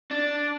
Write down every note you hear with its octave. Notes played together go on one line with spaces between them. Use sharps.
D4